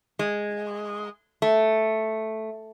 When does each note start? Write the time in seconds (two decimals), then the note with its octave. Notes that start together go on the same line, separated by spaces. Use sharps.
0.19 G#3
1.42 A3